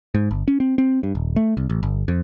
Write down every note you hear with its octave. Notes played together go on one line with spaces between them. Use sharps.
G#2
G1
C#4
C4
C4
G2
D#1
A3
C2
A1
G1
F2